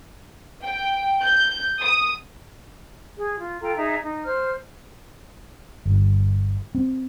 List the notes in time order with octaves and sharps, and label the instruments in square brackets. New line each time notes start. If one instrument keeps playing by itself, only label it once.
[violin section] G5
G6
D#6
[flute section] G#4
F4
F4 A4 G5 A#5
D#4 G#4 E5 A#5
D#4
C5 F6
[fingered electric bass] G1
C4